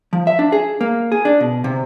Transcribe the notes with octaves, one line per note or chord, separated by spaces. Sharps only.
F3
E5
D4
G#4
A#3
G#4
D4
B2
C3